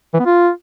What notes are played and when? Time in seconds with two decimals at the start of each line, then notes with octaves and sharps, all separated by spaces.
0.14 E3
0.20 B3
0.26 F4